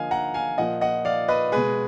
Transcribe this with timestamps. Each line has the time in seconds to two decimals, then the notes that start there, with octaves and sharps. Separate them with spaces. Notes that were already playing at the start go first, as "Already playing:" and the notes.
Already playing: D3 F3 A#3 D#5 F5 G#5
0.11 F#5 A#5
0.34 F5 G#5
0.58 A#2 F3 A#3 D#5 F#5
0.81 D#5 F#5
1.05 D5 F5
1.28 B4 D#5
1.52 B2 G#3 G#4 B4